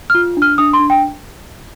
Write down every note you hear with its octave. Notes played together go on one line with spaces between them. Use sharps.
F6
F4
D4
F6
D4 D#6
C6
D4
G5